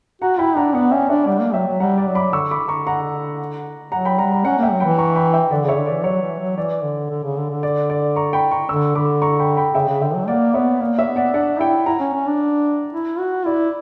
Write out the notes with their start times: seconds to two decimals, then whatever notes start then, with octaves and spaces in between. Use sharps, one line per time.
0.22 F#4 F#5 A#5
0.39 E4 G5 B5
0.57 D4 F#5 A#5
0.74 B3 D5 F#5
0.92 C#4 E5 G5
1.09 D4 C#5 E5
1.27 G3 D5 F#5
1.41 A#3
1.54 F#3 E5 G5
1.67 F#3
1.80 G3 F#5 A#5
1.98 D5 F#5
2.07 F#3
2.15 B5 D6
2.33 D3 C#6 E6
2.51 B5 D6
2.60 D3
2.68 A#5 C#6
2.87 F#5 A#5
3.92 F#3 F#5 A#5
4.05 G5 B5
4.18 G3 F#5 A#5
4.32 F#5 A#5
4.45 C#4 F#5 A#5
4.59 A#3 E5 G5
4.71 F#3
4.80 E3 G5 B5
4.98 A#5 C#6
5.16 G5 B5
5.33 E5 G5
5.51 D3 D5 F#5
5.65 C#3 C#5 E5
5.78 D3
5.87 E3 D5
6.04 F#3 C#5
6.22 E3
6.40 F#3
6.57 E3 D5
6.83 D3
7.10 D3
7.24 C#3
7.37 D3
7.50 D3
7.63 D5
7.90 D5
8.16 A#5 C#6
8.33 G5 B5
8.51 A#5 C#6
8.69 D3 C#6 E6
8.95 D3 B5 D6
9.22 A#5 C#6
9.39 G5 B5
9.57 G5 B5
9.75 C#3 E5 G5
9.88 C#3
10.01 D3 E5 G5
10.14 F#3
10.28 A#3 D5 F#5
10.54 B3 C#5 E5
10.81 A#3 D5
10.98 C#5 E5
11.07 B3
11.16 D5 F#5
11.34 D4 D5 F#5
11.60 E4 E5 G5
11.86 E4 F#5 A#5
12.00 C#4
12.13 C#4
12.26 D4
12.93 E4
13.19 F#4
13.46 E4 D5